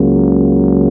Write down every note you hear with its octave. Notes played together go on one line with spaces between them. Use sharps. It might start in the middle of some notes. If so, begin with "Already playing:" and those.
Already playing: C#2 C#3 F#3 A#3